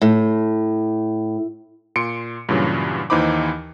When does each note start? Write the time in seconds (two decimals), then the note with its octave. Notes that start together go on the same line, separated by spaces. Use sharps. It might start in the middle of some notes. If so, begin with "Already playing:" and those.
0.02 A2
1.96 A#2 C6 C#7 D7
2.49 G2 A#2 C#3 E3 F#3
3.10 D#2 E3 D#4 C5 B5 D6